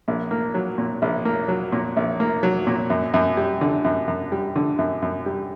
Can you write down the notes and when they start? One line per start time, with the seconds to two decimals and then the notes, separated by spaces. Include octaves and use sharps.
0.08 A#1
0.31 A#3
0.54 F#3
0.78 A#2
1.02 A#1
1.25 A#3
1.48 F#3
1.72 A#2
1.97 A#1
2.20 A#3
2.43 F#3
2.67 A#2
2.90 F#2
3.14 F#2
3.37 G3
3.61 D3
3.84 F#2
4.08 F#2
4.32 G3
4.56 D3
4.79 F#2
5.02 F#2
5.26 G3